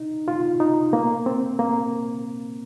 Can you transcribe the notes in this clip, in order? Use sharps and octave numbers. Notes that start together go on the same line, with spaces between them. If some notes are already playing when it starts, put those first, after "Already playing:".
Already playing: D#4
F4
D#4
A#3
C4
A#3